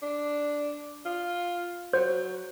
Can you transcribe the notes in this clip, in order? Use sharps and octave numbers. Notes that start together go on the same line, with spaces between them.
D4
F4
F#3 C5